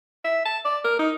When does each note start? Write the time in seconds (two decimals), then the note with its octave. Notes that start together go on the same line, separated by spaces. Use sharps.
0.24 E5
0.46 A5
0.65 D5
0.84 A#4
0.99 D#4